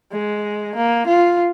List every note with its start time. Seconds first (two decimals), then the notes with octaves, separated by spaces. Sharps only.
0.12 G#3
0.75 A#3
1.07 F4